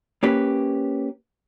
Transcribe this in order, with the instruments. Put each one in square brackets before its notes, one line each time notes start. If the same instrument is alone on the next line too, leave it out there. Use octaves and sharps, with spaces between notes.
[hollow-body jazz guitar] A#3 C#4 G4 B4